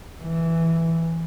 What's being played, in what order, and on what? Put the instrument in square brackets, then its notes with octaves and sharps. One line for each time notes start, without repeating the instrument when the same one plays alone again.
[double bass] E3